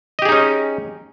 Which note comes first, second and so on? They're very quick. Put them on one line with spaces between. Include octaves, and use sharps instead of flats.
D#5 G4 G#4 D#4 C#4